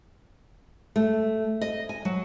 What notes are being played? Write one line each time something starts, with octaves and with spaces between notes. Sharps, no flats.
A3
D#5
G#5
F#3